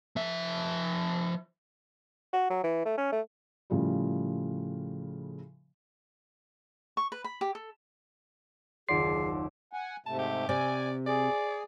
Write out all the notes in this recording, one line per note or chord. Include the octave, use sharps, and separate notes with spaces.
F3 E5
F#4
F#3
E3
A3
C#4
A3
A2 C#3 F3 G3
C#6
B4
B5
G4
A4
F#1 D#2 F4 G#4 D5 F#5 C6 C7
F#5 G#5
G#2 C3 A3 A5
G4
C3 C4 D5 G#5
G#4 D5